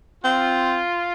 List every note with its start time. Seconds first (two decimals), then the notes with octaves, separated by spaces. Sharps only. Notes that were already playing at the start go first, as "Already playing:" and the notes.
0.23 C4 F4